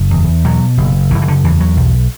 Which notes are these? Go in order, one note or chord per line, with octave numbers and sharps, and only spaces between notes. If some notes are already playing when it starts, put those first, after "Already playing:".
Already playing: F#1
E2
B2 F#3
F#1
F#1 E3
E3
D3
E2 E3
F#3
B1